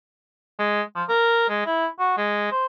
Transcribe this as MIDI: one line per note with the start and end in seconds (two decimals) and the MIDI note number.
0.59 0.82 56
0.95 1.04 53
1.09 1.49 70
1.50 1.65 56
1.66 1.87 64
1.99 2.13 66
2.18 2.50 56
2.52 2.66 72